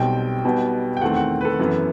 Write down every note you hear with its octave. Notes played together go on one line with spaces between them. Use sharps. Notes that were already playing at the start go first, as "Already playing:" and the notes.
Already playing: B1 B2 G3 C4 G5
B1 B2 G3 B3
G5
E2 D#3 A3 C4 F#5
F#5
B4
A4
F#2 E3 B3